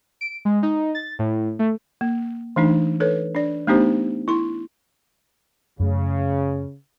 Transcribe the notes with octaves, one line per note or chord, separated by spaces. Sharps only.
D7
G#3
D#4
A6
A2
A3
A#3
E3 A3 D4 D#4
A4 B4 C#5
D4 D5
A3 B3 D4 D#4 G4 C5
E4 C6
F#2 C#3 A3